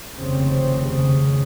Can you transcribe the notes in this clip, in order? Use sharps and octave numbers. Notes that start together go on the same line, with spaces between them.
F1 D#2 C#3 C4
C#3